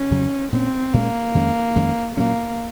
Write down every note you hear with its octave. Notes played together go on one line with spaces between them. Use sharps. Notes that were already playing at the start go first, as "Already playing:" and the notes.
Already playing: C#4
F2 C#3 F#3
A#2 G#3 C4 C#4
A#2 G#3 A#3 C#4
F2 D#3 G#3 C#4
F2 D#3 G#3 C#4
A#2 F#3 A#3 C#4